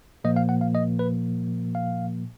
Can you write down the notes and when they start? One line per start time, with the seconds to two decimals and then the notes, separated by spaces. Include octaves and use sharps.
0.24 A#2 F3 A#3 D#5
0.36 F5
0.49 F#5
0.61 F5
0.75 D#5
0.99 B4
1.75 F5